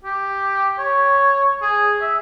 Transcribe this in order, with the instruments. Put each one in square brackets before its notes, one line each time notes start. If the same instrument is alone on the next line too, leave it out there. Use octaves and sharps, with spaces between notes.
[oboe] G4
C#5
G#4
E5